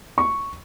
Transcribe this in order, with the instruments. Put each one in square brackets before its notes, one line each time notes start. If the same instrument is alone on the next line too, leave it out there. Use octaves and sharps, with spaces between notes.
[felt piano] C#6